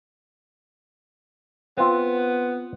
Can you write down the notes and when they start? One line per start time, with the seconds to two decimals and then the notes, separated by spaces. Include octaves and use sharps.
1.77 B3 C4 F4